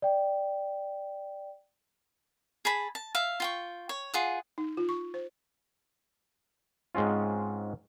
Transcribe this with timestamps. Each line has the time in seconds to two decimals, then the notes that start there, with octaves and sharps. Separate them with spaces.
0.02 D5 G5
2.65 G#4 A5 B5
2.95 A5
3.15 E5 F5
3.40 F4 G5 C#6
3.89 C#5
4.14 F4 G#4 F#5
4.58 D#4
4.77 F4
4.89 C#6
5.14 C5
6.95 G#2 G#3 C4 C#4 F4